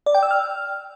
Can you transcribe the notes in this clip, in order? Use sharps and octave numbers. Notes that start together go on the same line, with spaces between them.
D5
G5
E6
F6